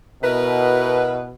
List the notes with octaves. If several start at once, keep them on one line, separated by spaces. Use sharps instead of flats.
B2 E4 A#4 B4